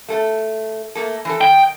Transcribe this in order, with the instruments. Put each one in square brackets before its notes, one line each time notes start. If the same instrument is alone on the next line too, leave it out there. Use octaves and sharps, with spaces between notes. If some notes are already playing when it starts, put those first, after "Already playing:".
[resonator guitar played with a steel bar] A3 A4
A3 A#3 A4
E3 A4
[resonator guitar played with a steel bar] D#3 [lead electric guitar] G5